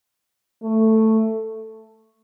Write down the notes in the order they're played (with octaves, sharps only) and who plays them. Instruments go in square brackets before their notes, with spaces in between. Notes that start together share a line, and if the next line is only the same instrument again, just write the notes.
[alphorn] A3